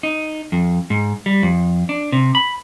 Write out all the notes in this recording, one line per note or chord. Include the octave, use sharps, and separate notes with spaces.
D#4
F2
G#2
G3
F2
D4
C3
B5